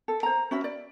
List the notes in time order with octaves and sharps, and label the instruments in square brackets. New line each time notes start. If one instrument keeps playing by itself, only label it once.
[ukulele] A4
C5 A#5
C#4 F#4 E5 B5
D5